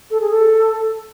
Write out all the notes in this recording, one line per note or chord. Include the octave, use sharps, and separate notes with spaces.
A4
G#4
A4